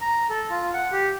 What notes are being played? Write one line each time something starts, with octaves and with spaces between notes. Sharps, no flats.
A#5
A4
F4
F#5
G4